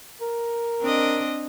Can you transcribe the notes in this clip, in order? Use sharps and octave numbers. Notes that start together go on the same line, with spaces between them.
A#4
C4 D4 D#5